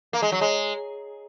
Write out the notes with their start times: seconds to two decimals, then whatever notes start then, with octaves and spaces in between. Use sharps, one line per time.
0.13 A#3
0.22 G#3
0.32 F#3
0.41 G#3